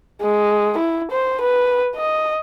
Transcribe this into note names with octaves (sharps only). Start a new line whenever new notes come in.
G#3
E4
C5
B4
D#5